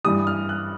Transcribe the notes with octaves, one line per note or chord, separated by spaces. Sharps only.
G2 E3 G3 D#6
F6
F#6